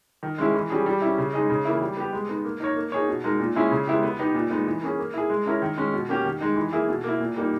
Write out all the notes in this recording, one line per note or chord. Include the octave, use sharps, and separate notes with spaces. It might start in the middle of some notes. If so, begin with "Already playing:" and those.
D#3
G#3 C#4 E4 G#4
E3
G3 C#4 G#4
G3
C#4 E4
C#3
G#3 D#4 G#4 D#5
C#3
E3 A#3 E4
G3
B3 G4
G#3
B3 D#4
A#3
D#4 A#4 C#5
A#3
D#4 G#4 C#5
B2
G#3 D#4 A#4
A#2
G#3 C#4 E4 G#4
C#3
G#3 B3 E4 G4
B3
D#4 G4 B4
A#2
G#3 B3 D#4
E3
A#3 C#4 G#4 C#5
A#3
E4 G#4
G#3
C#4 E4 A#4 C#5
D#3
G#3 C#4
B2
A#3 C#4 G4
D#3
G#3 D#4
E3
A#3 E4 G#4
B2
A#3 E4
A#2
G3 A#3 D#4